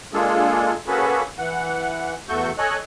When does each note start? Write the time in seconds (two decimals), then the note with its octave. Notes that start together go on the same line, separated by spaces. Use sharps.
0.14 G#3 A#3 D4 F4 G#4 A4
0.87 A#3 C#4 F#4 G#4 A4 B4
1.39 E3 F#5
2.29 E2 A3 F#4 A4 C#6 G6
2.58 A4 C#5 D#5 G#5 F#6